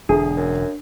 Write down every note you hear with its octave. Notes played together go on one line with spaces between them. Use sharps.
E1 D3 A3 D4 G#4
F#2